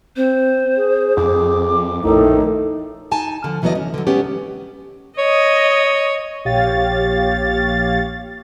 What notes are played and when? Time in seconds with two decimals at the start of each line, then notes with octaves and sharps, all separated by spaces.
0.16 C4 C5
0.77 G#4
1.17 F2 D6
2.04 A#1 A2 D#3 D#4 A4
3.11 D#4 G#5 A5
3.44 D3 F3
3.62 D2 E3 F#3 B3 D5 D#5
3.75 C#4
3.94 D3 F#3
4.07 G#3 B3 C#4 G4
5.18 C#5 D#5
6.45 A#1 G4 C#5 F5 A6